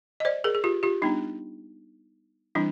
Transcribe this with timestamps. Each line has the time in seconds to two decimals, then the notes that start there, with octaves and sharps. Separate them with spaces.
0.20 D#5
0.25 C5 D5
0.44 G#4 A#4
0.55 G#4
0.64 F4 G4
0.83 F4 G4
1.02 G3 B3 D4 D#4
2.55 E3 G3 C4 D4 E4